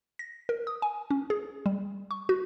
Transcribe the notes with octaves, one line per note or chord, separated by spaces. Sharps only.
A#6
A#4
D#6
G#5
C#4
G#4
G3
C#6
F#4